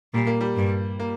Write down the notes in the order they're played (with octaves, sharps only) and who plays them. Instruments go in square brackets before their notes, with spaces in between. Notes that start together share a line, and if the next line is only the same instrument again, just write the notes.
[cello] A#2 [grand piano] G3
[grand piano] A#3
G3
[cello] G2
[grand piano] A#3